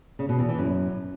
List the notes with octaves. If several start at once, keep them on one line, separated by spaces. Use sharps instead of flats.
C#3
B2
E2
E3
F#2